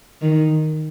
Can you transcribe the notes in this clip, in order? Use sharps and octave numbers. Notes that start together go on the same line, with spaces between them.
D#3